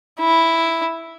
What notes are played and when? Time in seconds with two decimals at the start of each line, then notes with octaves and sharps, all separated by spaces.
0.20 E4